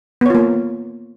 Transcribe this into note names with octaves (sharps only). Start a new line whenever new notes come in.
A#3 B3 F4 C#5